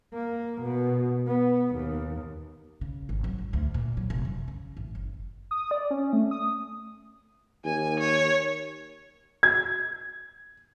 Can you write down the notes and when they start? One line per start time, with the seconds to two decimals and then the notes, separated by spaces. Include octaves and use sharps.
0.13 A#3
0.62 B2
1.27 B3
1.75 D#2
2.81 C#3
3.09 G#1
3.24 F#3
3.39 G#2
3.53 D2
3.74 A#2
3.97 F#3
4.10 F1
4.25 F#2
4.48 C#3
4.77 A1
4.95 F#1
5.51 D#6
5.71 D5
5.91 C#4
6.13 A3
6.31 D#6
7.65 D#2 G#5
7.99 C#5
9.43 G#6